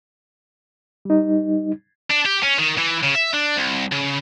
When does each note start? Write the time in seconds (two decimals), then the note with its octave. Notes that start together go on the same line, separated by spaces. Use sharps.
1.05 G3 D#4
2.11 D4
2.26 G4
2.43 C#4
2.59 D#3
2.78 E3
3.03 C#3
3.15 E5
3.33 D4
3.56 C2
3.92 C#3